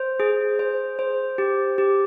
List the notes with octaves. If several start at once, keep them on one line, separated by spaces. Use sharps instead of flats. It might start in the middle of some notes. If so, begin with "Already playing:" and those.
Already playing: C5
G#4
C5
C5
G4
G4